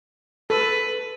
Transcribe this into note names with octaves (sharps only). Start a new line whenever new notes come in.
A4 B4